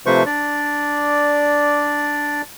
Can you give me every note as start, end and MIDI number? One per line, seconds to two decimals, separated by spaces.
0.06 0.23 48
0.06 0.23 53
0.06 0.23 57
0.06 0.23 71
0.06 0.23 72
0.06 0.23 85
0.26 2.42 62
0.26 2.42 74